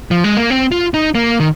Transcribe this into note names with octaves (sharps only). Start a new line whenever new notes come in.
F3
G#3
A#3
C4
F4
D#4
A#3
D#3